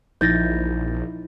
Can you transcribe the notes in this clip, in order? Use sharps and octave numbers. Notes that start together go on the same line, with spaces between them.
A#1 F3 D#4 E4 G6 A6 A#6